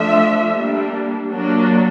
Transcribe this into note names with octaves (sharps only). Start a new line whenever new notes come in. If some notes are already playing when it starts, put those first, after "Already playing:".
Already playing: F3 A3 D4 E5
G3 A#3 D4
F#3 A#3 D4